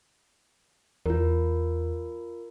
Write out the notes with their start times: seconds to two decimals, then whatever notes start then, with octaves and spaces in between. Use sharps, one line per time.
1.06 E2 F4 A#4